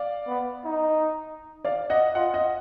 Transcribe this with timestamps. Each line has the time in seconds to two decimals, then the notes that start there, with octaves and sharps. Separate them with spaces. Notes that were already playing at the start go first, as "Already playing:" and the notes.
Already playing: D5 F5
0.27 B3
0.65 D#4
1.65 D5 F5
1.90 D#5 F#5
2.15 F4 D#5 F#5
2.34 D#5 F#5